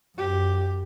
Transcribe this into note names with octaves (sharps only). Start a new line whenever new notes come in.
F#2 G4